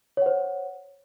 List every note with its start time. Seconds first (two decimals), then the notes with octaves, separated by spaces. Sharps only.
0.17 C#5
0.22 F#5
0.26 C5